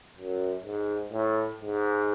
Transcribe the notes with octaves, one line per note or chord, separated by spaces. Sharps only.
F#2
G#2
A2
G#2